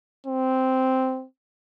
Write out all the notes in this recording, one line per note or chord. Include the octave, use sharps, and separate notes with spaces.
C4